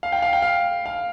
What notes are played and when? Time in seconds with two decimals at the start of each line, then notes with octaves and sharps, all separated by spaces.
0.03 F5
0.12 G5
0.22 F5
0.33 G5
0.42 F5
0.86 F5